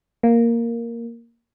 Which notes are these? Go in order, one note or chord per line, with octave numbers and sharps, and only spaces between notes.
A#3